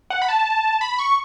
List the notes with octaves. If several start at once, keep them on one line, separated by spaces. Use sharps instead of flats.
F#5
B5
A5
B5
C#6